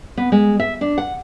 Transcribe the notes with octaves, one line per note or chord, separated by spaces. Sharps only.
B3
G#3
E5
D4
F#5